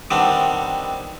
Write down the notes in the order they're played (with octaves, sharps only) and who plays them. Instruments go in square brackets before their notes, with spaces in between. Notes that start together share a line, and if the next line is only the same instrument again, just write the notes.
[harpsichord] D#3 G3 B3 C4 D4